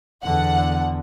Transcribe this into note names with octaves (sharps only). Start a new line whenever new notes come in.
E2 D3 F#5